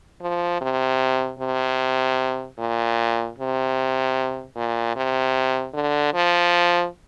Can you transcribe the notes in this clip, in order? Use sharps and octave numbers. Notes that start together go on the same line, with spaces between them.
F3
C3
C3
A#2
C3
A#2
C3
D3
F3